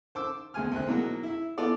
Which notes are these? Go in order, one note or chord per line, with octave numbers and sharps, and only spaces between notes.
C5 D6 E6
D2 B2 G#4 G#5 F6
D2 C3 C4 F#6
B2 E3 F#3 G#3 A#3
E4 E5
E3 B3 F4 A4 D5